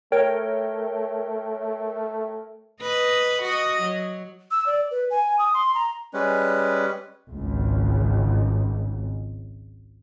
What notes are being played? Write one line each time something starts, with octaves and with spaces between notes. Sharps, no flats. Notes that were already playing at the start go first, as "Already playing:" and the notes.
A3 A#4 C#5 G5
B4 D#5
F#4 D#5
F#3
E6
D5
B4
G#5
D#6
C6
A#5
G3 G#3 C#4 B4
G#1 C#2